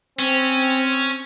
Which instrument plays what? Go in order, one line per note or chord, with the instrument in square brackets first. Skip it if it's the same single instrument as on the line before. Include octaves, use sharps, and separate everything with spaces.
[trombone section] C4 [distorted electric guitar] C#4